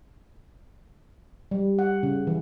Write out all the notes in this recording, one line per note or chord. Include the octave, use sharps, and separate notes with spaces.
G3
F#5
C#3
E3